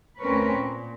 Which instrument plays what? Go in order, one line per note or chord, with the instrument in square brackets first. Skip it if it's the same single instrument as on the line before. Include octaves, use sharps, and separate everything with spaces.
[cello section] D2 C4 C#4 A#4 B4 C#5
A#2